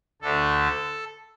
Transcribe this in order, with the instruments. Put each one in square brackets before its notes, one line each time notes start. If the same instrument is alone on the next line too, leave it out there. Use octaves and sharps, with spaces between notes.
[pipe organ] D2 D3 A3 D4 A4